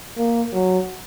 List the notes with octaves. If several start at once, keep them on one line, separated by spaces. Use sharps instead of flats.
A#3
F#3